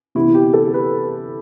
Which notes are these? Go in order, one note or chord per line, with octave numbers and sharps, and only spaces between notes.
C3 E3 B3 E4
G4
A4
B4